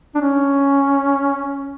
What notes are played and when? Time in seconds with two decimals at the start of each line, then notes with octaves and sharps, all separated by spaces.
0.15 D4
0.21 C#4